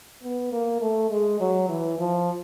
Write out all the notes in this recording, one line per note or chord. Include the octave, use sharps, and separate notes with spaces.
B3
A#3
A3
G#3
F#3
E3
F3